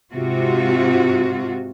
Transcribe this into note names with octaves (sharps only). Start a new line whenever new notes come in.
G#2 C3 F4 F#4